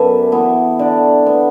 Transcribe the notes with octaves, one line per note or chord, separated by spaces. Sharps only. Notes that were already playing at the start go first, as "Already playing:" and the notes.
Already playing: F#2 B3 A4 B4 D5 E5
E3 B3
D3 D5
B3